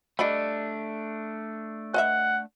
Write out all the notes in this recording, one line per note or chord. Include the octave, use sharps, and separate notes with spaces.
G3 A3 D4 D#5 B5
B4 D#5 E5 F#5